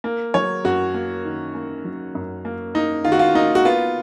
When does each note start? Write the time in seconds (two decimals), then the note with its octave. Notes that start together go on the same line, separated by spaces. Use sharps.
0.04 A#3
0.34 F#3 C#5
0.65 F#2 F#4
0.94 A#3
1.25 D#3
1.55 A#3
1.85 F#3
2.15 F#2
2.45 A#3
2.75 A#3 D#4
3.05 D#3 F4
3.12 F#4
3.19 F4
3.35 A#3 D#4
3.55 F#4
3.65 B3 F4